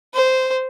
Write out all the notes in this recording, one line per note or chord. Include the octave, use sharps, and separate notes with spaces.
C5